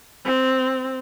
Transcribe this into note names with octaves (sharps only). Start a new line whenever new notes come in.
C4